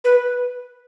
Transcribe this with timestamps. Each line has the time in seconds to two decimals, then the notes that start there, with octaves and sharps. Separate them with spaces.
0.04 B4